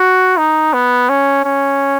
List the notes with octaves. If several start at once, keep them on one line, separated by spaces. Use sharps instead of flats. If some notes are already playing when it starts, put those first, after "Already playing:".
Already playing: F#4
D#4
B3
C#4
C#4